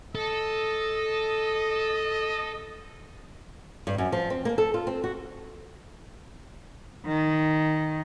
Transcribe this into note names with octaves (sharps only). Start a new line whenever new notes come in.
A4 D#5
G2
F#2
F3
C4
A#3
A4
F4
C4
F#4
D#3